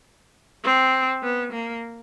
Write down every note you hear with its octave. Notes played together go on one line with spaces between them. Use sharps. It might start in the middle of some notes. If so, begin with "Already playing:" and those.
C4
B3
A#3